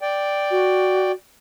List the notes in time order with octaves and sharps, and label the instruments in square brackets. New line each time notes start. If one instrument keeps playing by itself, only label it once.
[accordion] D5 G5
[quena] F#4